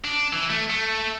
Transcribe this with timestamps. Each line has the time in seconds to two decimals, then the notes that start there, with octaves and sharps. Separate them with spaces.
0.04 D4
0.33 E3
0.50 A3
0.70 A3